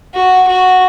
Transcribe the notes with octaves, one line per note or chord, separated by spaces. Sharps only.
F#4
F#4